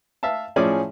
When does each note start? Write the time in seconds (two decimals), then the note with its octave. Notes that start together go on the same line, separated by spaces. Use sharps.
0.23 E5 F5 A5
0.56 A2 F3 C#4 G#4 D5 G#5